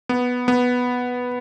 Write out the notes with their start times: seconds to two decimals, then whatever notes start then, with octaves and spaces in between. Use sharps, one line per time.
0.09 B3
0.48 B3